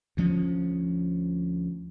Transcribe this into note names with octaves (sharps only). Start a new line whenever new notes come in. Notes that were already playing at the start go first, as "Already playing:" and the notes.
D2 F3 C#4